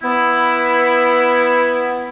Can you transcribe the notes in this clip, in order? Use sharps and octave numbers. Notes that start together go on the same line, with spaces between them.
B3 E4